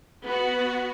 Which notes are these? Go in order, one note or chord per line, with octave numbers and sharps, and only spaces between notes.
B3 F#4